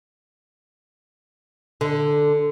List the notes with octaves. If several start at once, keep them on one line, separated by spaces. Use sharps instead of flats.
D3